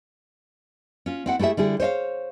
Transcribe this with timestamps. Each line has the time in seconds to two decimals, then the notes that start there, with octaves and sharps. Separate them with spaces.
1.06 C#4 F4
1.26 C4 E4 F#5
1.39 A3 E4 G4 G#4 E5
1.57 D3 G3 E4 G#4
1.80 C5 C#5 D#5 F5